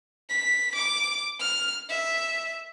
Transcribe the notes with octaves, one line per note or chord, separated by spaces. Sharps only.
B6
D6
F6
E5